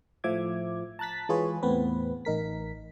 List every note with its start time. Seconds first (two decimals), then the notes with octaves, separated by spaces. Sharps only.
0.24 A2 F3 E5 D6 G#6
0.99 A5 A#5 F#6 A6 B6
1.29 E3 G#3 F4 G#4 B4 C#5
1.63 E2 A2 B3 C4 B4
2.25 A1 D#4 A#4 B6